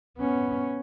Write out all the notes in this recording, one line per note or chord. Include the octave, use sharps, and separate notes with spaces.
B3 C#4